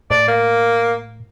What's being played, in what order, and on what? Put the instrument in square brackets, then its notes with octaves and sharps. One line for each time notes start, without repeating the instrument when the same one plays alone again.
[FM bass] A2 [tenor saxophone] D5
[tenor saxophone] A#3